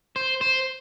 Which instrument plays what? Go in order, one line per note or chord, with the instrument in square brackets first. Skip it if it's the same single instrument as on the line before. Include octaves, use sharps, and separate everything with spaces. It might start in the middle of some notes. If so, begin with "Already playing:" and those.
[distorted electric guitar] C5
C5